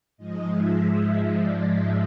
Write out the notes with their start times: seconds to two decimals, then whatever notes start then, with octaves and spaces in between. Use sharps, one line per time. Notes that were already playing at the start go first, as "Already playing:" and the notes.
0.17 G#2 F3 G#3 D#5
0.48 E5
1.38 D5
1.69 E5